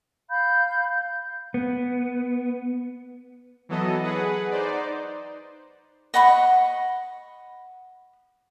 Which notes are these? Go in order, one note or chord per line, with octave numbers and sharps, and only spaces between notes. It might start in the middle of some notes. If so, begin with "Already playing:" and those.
F5 B5 G6
B3
E3 F#3 B3 A4 D#5
G#4 B4 F#5
D#4 C5 D5
D#5 F#5 B5 C#6